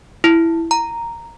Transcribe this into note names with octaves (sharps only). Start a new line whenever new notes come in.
E4
A#5